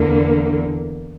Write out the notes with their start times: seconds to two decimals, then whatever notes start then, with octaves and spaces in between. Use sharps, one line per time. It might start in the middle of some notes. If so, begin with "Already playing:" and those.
Already playing: E2 D3 A#3